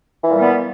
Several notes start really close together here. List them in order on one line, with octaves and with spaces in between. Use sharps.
E3 A#2 G3 B3